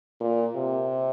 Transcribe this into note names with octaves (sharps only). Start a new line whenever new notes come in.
A#2
C3